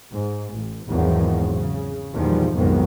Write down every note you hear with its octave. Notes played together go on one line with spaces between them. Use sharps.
G#2
A1
G#1 E2 D#3 F3 F#3
C#3
E2 A#2 D#3 F3 G3
B1 F2 G#2 D#3 B3